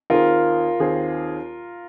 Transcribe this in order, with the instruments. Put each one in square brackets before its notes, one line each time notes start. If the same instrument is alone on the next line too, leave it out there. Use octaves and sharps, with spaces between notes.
[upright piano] D#2 D#3 C4 G#4 [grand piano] F4 A#4
[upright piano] D#2 D#3 C4 G#4